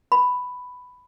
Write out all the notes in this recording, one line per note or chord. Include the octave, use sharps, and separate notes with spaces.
B5